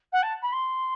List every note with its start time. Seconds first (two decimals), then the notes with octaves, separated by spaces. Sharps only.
0.12 F#5
0.22 A5
0.42 B5
0.52 C6